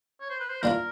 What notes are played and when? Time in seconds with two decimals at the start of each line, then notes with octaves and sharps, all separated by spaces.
0.21 C#5
0.30 C5
0.40 B4
0.50 C5
0.63 E3 G3 A#3 D4 F4 A#4